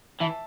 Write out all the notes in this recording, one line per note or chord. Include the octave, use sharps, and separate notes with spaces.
E3 E5 A5